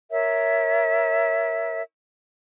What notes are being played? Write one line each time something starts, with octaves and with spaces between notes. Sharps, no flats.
A#4 C#5 E5